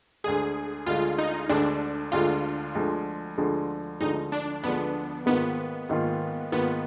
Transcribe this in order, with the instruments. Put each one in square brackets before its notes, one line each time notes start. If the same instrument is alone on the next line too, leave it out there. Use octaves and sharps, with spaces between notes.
[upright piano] D2 D3 G#3 [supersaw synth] G#4
[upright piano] D2 D3 G#3 [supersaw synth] F4
[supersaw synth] D#4
[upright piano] D2 D3 G#3 [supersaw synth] D4
[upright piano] D2 D3 G#3 [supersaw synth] F4
[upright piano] D2 D3 F3 G#3
D2 D3 F3 G#3
[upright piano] D2 D3 F3 G#3 [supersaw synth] D#4
[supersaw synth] D4
[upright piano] D2 D3 F3 G#3 [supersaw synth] B3
[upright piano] G#2 D#3 A#3 F4 [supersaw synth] B3
[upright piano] G#2 D#3 A#3 F4
[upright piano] G#2 D#3 A#3 F4 [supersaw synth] B3